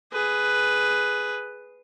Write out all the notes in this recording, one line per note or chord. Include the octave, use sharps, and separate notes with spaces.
G#4 B4